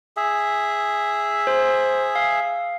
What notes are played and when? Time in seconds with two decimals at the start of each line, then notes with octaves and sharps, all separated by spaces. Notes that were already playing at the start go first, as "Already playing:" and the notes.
0.17 G#4 E5
1.47 C5
2.15 F5